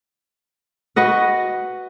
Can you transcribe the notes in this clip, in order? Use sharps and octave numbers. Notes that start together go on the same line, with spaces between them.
F#4 B4 D#5 F#5